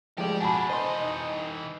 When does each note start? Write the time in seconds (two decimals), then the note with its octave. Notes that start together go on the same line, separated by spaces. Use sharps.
0.18 F3 G#3 G4 D5
0.40 B2 D4 F#4 G#5 A5 B5
0.70 E3 C5 D#5 C6
1.01 D#4